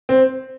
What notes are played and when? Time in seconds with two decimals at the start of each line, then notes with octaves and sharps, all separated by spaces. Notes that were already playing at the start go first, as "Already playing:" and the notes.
0.09 C4